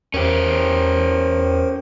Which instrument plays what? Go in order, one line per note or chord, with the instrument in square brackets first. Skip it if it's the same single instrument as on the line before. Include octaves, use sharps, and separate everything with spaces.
[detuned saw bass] E2 [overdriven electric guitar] C#4 G4 [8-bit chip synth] A#4 C5